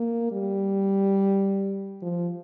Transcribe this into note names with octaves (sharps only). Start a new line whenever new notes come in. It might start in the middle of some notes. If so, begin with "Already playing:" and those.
Already playing: A#3
G3
F3